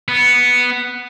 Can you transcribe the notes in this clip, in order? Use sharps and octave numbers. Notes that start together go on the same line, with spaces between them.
B3